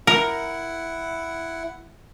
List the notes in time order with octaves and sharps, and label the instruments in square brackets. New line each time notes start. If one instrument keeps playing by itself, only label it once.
[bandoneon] E4 F#5 [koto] A#4